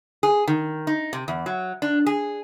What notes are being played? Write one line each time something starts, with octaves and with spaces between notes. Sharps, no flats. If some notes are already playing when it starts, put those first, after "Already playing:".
G#4
D#3
D#4
C3
E2
F#3
D4
G#4